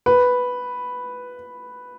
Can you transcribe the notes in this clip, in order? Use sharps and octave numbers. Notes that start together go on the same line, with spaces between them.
B4